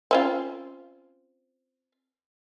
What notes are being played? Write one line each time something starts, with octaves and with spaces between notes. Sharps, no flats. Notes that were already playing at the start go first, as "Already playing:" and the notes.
C4 C#4 F4